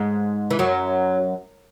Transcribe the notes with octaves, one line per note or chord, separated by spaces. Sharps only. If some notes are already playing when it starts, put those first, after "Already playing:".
Already playing: G#2 G#3
E3
F#2 F#3